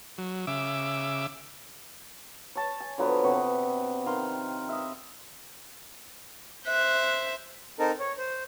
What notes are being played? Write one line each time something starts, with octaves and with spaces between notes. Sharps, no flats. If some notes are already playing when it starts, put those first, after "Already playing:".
F#3
C#3 E5 D6
C#5 A5
G#5
D3 F3 F#3 B3
C3 B3 G4 C#6
D#3 F5 C6
D#5 E5
C5 E5 F#6
C4 D#4 A4 A#4
C#5
C5